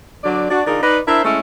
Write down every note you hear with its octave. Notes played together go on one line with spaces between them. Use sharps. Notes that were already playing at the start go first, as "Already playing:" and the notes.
D3 F#3 D5
D4 F#4
D3 D4 D#4 F4 G#4 A#4
D#4 B4 D5
D4 E4 A#4 C5 E5
G#3 A3 C#4 E4 A4